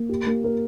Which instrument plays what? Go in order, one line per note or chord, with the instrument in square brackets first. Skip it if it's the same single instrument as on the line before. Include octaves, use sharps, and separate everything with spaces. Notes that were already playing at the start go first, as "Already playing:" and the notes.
Already playing: [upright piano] A#3
G4
A#3
A#4